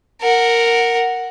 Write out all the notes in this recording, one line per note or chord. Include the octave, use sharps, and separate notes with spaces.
A#4 F#5